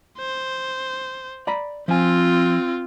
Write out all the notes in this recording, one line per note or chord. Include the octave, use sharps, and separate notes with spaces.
C5
D5 A#5 B5
F3 C4 F4 G#5